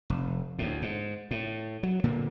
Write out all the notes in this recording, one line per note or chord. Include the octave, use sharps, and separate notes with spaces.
F1
D2 A2
G#2
A2
F#3
A#2 D3 A#3